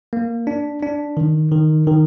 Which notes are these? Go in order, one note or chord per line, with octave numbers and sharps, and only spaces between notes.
A#3
D4
D4
D#3
D#3
D#3